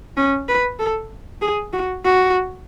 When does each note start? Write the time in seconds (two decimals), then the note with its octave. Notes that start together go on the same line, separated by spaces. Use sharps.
0.17 C#4
0.48 B4
0.79 A4
1.41 G#4
1.73 F#4
2.04 F#4